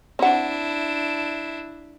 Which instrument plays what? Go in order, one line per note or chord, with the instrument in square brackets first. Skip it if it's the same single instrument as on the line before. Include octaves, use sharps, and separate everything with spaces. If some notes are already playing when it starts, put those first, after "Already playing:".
[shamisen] C4 F#5 [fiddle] D4 E4